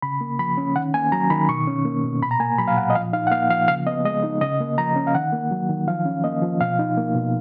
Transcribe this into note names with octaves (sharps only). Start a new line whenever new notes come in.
C#3 B5
A#3
F3 B5
C#4
D#3 F#5
A#3 G#5
F#3 A#5
D#3 B5
B2 C#6
C#4
A#3
B2
A#2 B5
A#5
A#3 G#5
F#3 B5
F5
A#2 F#5
D#5
F3 F5
D#4 F5
F#5
A#3 F5
F3 F5
C#3 F5
B3 D#5
G#3 D#5
D#4
C#3 D#5
A#3
F3 A#5
C#4
F5
D#3 F#5
A#3
F#3
D#3
F3 F5
C#4
A#3 D#5
F3
B2 F5
D#4
A#3
B2